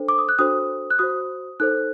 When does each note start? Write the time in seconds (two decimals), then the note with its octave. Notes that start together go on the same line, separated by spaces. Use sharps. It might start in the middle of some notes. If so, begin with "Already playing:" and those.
Already playing: D4 A4 C5
0.08 D6
0.18 D#6
0.29 F#6
0.39 D4 F#4 A4 C5 D#6
0.90 F#6
0.99 F#4 C5 D#6
1.60 D#4 A4 C5 F#6